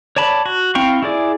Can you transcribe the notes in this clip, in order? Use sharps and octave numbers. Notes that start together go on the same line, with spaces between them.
C#5 D5 A5 B5
F#4
C4 E4 F5 G5 C#6
E4 G#4 D5